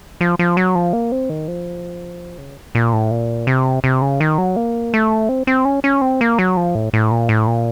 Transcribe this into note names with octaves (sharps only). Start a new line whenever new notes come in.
F3
F3
F#3
F3
A#3
C4
D#3
F3
C#3
A#2
A2
A#2
C3
C3
C#3
D#3
F#3
A#3
A3
C4
C4
C#4
C#4
C4
A#3
F#3
F3
A2
A2
A#2
A2
A#2